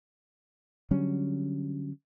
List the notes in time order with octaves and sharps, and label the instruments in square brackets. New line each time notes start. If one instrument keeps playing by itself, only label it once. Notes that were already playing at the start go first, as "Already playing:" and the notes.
[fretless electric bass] D3 F#3 G3 C#4